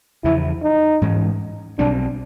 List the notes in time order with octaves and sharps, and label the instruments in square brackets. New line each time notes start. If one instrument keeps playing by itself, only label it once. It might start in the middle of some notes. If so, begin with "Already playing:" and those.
[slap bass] E2 C#3 F3 [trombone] E4
[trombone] D#4
[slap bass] G#2 E3 G#3 C#4
[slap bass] B1 B2 G3 C4 [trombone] D4